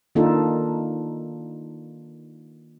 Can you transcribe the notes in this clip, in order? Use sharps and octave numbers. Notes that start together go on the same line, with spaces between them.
D#3 A#3 D4 D#4 F4 A4